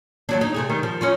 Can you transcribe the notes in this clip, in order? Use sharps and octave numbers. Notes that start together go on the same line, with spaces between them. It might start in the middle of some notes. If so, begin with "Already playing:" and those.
D#2 F#3 D4
D#4
C3 A3 G#4
D#3 G3 D#4
F3
C#4 D#4 F4